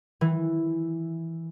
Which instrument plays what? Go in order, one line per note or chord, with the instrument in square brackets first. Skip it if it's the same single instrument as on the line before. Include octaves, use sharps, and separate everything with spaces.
[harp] E3